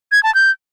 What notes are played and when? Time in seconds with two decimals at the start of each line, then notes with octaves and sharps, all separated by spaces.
0.12 G#6
0.23 A5
0.35 G6